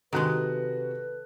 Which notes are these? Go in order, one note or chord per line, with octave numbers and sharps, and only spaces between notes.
C3 D#3 G#3 F#4 A4 B4 F#6